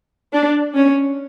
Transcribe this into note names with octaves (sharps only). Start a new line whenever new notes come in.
D4
C#4